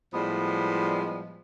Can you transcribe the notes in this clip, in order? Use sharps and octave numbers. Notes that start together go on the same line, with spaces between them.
A2 F3 G3 G#3 B3